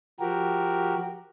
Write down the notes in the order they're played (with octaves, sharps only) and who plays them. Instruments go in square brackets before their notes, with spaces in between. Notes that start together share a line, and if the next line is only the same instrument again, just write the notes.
[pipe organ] F3 F#4 G4 A#4